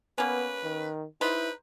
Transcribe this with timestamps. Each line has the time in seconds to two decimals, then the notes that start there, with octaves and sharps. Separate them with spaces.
0.18 A#3 B3 C#4 B4
0.64 D#3
1.21 D#4 E4 B4 C5